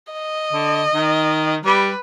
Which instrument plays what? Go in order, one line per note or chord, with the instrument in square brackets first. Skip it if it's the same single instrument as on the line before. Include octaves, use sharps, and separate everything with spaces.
[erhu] D#5
[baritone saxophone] D3
D#3
[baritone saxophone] G3 [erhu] B4